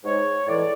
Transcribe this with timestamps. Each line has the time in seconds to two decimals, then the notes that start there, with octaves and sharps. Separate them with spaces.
0.04 G#2 G#3 C#5
0.47 A2 E3 G#3 D5